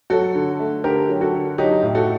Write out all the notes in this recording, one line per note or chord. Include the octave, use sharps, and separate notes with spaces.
F#3 F#4 A4
D3
A3
D3 G4 A#4
F#3
F#4 A4
D3
F#3 D#4 G4
A2
F#4 A4